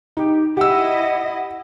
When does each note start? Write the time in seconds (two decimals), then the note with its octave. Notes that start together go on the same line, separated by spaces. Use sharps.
0.17 D#4 G4
0.57 E4 G4 D#5 F#5 E6